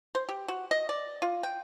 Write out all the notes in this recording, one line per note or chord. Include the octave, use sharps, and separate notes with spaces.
C5
G4
F#4
D#5
D5
F4
G5